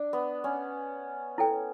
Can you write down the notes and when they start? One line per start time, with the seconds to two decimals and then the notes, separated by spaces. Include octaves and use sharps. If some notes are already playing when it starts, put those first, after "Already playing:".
Already playing: D4
0.13 B3
0.44 C#4
1.38 E4 A4 C#5 G5